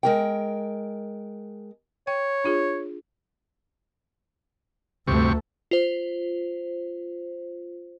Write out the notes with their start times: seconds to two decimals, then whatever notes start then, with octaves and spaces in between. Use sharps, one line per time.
0.03 G#3 A#4 G5
2.07 C#5 G5
2.44 D4 F4 G#4
5.08 D2 G2 C3 A3 C#6
5.71 F4 C5